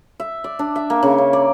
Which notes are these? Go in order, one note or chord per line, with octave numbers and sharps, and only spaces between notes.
E5
D5
D4
E5
A#3
C#3
C#4
D5